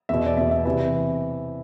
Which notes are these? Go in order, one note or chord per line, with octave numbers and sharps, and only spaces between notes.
E2 B2 E5
D5
E2 B2 E5
E5
C3 E3 E5